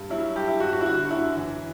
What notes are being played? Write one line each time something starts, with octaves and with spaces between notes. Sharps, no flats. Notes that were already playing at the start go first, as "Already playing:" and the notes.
Already playing: G2
F#3 E4
G2 G4
E4
G2 F#4
F#4
E4
D3 F#4
F#2 E4
E3